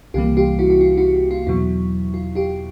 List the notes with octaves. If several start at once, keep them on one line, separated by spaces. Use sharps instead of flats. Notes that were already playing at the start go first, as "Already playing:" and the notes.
C2 C3 E3 G3 A#3 F4 G4
F4 G4
E4 F#4
F#4
F4
E4 F#4
F4
E2 B2 F#3 E4
F4
F4 G4